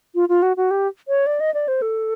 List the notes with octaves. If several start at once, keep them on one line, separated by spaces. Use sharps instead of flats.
F4
F4
F#4
F#4
G4
C#5
D5
D#5
D5
C5
A4